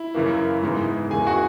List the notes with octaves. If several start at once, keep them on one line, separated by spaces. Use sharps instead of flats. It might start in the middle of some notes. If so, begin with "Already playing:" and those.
Already playing: E4
F#2 C#3 E3 A#3
G#2 E3 G#3 B3
E2 C#3 E3 A#3 G#4 G#5
F#4 F#5